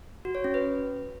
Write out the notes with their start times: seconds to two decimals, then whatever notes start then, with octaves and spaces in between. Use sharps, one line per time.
0.25 F#4
0.35 C#5
0.44 C#4
0.54 B4